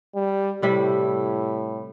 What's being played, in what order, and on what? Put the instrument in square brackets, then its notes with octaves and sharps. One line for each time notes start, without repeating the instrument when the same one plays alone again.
[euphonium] G3
[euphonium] A2 [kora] C3 G3 E4